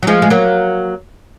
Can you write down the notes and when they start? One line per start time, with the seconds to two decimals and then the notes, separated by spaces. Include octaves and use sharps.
0.03 F#3
0.07 F3 G#3
0.22 G#3
0.30 F#3 A#3